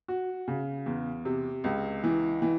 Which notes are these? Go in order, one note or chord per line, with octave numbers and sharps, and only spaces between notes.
F#4
C#3
E2
C3
C#2
E3
E3